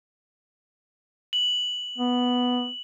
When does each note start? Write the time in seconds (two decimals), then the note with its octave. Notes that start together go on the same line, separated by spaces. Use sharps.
1.33 F#7
1.98 B3